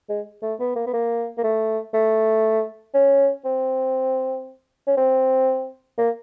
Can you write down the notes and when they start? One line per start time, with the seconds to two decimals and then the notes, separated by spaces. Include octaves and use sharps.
0.09 G#3
0.43 A3
0.60 B3
0.76 A#3
0.87 B3
0.94 A#3
1.38 A#3
1.44 A3
1.94 A3
2.95 C#4
3.45 C4
4.87 C#4
4.98 C4
5.98 A#3